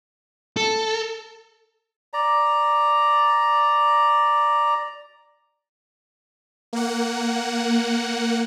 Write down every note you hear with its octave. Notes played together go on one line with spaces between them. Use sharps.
A4
D5 A#5
A#3 F#5